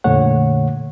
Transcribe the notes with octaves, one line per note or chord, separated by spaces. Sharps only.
F2 A#2 D3 A3 C#5 F#5